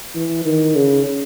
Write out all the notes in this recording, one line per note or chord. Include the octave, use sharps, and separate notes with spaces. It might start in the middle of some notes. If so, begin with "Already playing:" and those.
E3
D#3
C#3